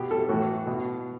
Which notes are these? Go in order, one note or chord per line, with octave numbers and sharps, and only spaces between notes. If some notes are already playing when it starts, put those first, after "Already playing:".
Already playing: B2 G4
A4
A2 E3 F#4
B2